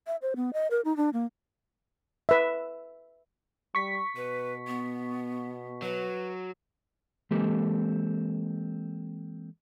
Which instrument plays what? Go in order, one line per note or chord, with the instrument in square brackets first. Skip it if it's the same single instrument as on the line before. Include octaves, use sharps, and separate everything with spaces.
[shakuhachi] E5
C5
B3
D#5
A#4
D#4
D4
A#3
[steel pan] B4 E5
[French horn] G3 [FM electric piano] C#6 B6
[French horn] B2 [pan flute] B4
[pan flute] B3
[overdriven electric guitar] F#3 [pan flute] B4
[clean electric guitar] E3 G#3 A#3 C4 G4 A4